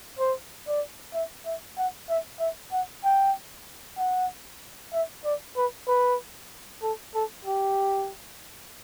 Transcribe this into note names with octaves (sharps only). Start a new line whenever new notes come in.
C5
D5
E5
E5
F#5
E5
E5
F#5
G5
F#5
E5
D5
B4
B4
A4
A4
G4